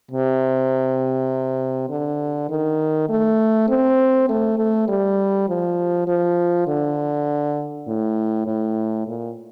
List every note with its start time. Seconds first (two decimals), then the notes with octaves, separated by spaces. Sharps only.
0.11 C3
1.90 D3
2.50 D#3
3.09 A3
3.69 C4
4.29 A3
4.58 A3
4.88 G3
5.49 F3
6.08 F3
6.68 D3
7.87 A2
8.47 A2
9.07 A#2